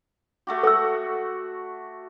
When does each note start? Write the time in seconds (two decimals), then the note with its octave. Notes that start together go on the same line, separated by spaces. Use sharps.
0.47 A3 F#4 G4
0.63 F#4 A4 E6